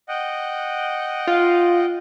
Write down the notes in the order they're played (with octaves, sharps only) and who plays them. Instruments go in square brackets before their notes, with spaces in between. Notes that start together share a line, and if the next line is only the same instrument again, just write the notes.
[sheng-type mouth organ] D#5 F#5 G5
[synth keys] F4